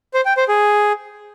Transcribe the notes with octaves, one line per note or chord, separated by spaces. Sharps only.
C5
G5
C5
G#4